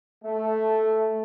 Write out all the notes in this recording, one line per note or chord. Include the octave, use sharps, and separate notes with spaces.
A3